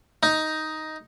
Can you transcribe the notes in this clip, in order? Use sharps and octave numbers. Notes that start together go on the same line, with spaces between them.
D#4